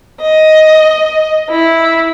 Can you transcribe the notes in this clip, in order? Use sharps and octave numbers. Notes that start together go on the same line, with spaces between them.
D#5
E4